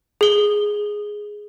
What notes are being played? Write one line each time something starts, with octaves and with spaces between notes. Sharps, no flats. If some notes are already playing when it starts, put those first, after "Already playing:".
G#4 G7